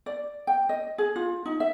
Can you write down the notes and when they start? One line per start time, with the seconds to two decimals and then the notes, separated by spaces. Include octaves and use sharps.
0.06 D5
0.47 G5
0.69 D#5
0.98 G#4
1.16 F4
1.46 D#4
1.60 E5